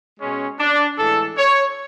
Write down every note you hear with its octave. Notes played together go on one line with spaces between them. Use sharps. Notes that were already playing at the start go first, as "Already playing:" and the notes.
B2 G#3 C#4
D4
A2 E3 G#3 A4
C#5